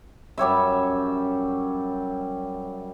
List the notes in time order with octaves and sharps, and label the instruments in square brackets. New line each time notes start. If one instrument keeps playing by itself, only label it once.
[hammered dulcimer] F#2 G3 C#5 E5